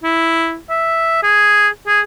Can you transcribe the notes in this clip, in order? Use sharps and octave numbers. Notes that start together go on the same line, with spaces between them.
E4
E5
G#4
G#4